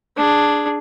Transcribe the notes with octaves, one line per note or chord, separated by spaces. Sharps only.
D4 G#4